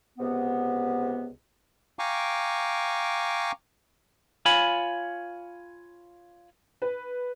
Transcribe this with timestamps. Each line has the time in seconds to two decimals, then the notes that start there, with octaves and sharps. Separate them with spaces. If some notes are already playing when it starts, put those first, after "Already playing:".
0.18 C#2 C3 B3
1.99 F5 G5 G#5 A#5 C#6 D6
4.46 F4 C#5 G#5 B5
6.82 B4